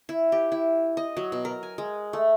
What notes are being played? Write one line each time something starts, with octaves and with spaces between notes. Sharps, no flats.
E4
G4
E4
D#5
F#3
B2
A#4
G#5
G#3
A3